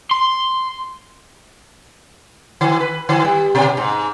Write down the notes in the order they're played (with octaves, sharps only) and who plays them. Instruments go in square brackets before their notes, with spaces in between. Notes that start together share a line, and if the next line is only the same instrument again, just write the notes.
[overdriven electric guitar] C6
[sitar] D#3
B4
D#3
G3
B2
G#2